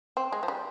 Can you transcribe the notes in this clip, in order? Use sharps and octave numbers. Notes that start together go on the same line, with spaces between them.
C4
G#3
F3
G3